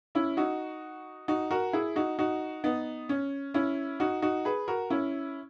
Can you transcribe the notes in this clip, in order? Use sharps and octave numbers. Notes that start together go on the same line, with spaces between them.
C#4 E4
D#4 F#4
D#4 F#4
F#4 A#4
E4 G#4
D#4 F#4
D#4 F#4
B3 D#4
C#4
C#4 E4
D#4 F#4
D#4 F#4
G#4 B4
F#4 A#4
C#4 E4